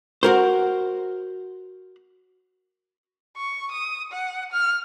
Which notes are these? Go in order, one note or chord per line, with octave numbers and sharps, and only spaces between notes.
F#4 A#4 C5
C#6
D#6
F#5
F6